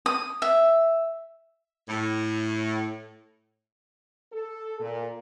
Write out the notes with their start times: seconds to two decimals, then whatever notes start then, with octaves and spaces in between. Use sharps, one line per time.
0.06 D#6
0.42 E5
1.88 A2
4.32 A4
4.79 A#2